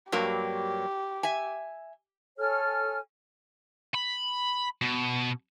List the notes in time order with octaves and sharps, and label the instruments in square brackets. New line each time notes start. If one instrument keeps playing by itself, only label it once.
[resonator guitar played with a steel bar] G2 F#3 A#3 [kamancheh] G4
[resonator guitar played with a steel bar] E5 G#5
[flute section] A4 C#5 G#5 F6
[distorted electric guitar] B5
B2